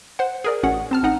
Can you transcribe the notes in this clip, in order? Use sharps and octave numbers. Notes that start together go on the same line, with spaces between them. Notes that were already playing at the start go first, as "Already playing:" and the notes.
C5 F#5
G#4 A#4 D5
A1 C#4 F#4 F#5
C4 A5 F6
A1 D#4 F#5 A#5